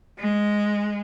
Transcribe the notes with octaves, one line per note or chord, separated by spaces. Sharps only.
G#3